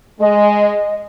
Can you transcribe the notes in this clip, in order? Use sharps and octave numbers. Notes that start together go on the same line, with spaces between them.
G#3 D#5